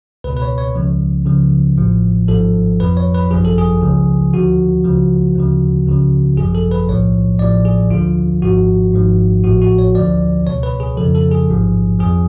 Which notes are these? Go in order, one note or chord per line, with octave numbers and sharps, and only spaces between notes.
C#2 B2 B4
B4
C#5
C#5
C#2 C#3 F3
C#2 C#3 F3
A1 A2 F3
G#1 G#2 F3 A4
F2 F3 B4
C#5
B4
G#1 F#2 F3 G#4
A4
G#4
C#2 C#3 F3
D2 D3 F3 F#4
C#2 C#3 F3
D2 C#3 F3
C#2 C#3 F3
G#1 F#2 F3 G#4
A4
B4
B1 A2 F3 C#5
A1 A2 F3 D5
G#4
D2 D3 F3 F4
G#1 G#2 F3 F#4
G#1 G#2 F3
A1 A2 F3 F#4
F#4
C#5
D2 D3 F3 D5
C#2 B2 C#5
B4
G#4
F2 C#3 F3 A4
A4
G#4
A1 G#2 F3
F2 F3 G#4